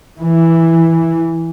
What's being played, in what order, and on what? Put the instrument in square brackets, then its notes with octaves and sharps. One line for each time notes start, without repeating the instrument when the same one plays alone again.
[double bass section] E3